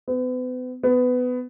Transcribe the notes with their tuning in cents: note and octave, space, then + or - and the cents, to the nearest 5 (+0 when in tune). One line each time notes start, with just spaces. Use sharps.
B3 +40
B3 +20